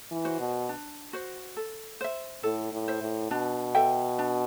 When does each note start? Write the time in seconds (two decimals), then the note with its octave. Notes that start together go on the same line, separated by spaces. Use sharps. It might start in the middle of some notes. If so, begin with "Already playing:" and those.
0.11 E3
0.25 F#4 C5
0.40 B2
0.69 D4
1.13 F#4 C5
1.57 A4
2.01 C5 E5
2.43 A2 A4
2.72 A2
2.88 C5 E5
3.01 A2
3.31 B2 D4
3.75 A4 E5 G5
4.19 D4